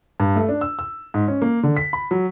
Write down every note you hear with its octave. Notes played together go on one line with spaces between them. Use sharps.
G2
A3
D4
E6
E6
G#2
C#4
A#3
D3
B6
B5
F#3